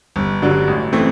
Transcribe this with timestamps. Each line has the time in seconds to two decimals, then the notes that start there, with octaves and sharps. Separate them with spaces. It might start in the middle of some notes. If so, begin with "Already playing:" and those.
0.16 G1
0.42 G2 D3 F#3
0.67 A1
0.93 E3 A3 C4